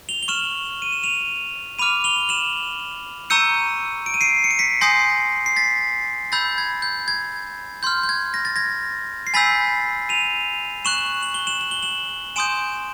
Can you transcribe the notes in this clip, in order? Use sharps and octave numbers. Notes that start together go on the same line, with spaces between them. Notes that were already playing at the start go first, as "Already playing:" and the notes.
F7 G7
G7
C#6 F6 E7 F#7
D#7
E7
D#7 F7
B5 D6 F6 D#7 F7
F7 G7
E7 F#7
A#5 C#6 E6 G6 C#7 D#7
D7
D#7
C7 D7
C#7
D7
B6 C#7
G#5 C6 D#6 G6 A#6 C7
C7
A6 B6
B5 E6 G6 A6
G#6
G6
G#6
C6 F6 G6
G6
G#6
A#6
A6
G#6 A#6
C7
G#5 B5 E6 G6 A6 B6
D#7 F7
C#6 F#6 E7 F#7
F#7
G7
E7 F#7
F#7
G7
E7 F#7
G#5 C6 D#6 G6 D7 E7